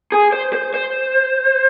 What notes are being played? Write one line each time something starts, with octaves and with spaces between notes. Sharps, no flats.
G#4
C5
C5
C5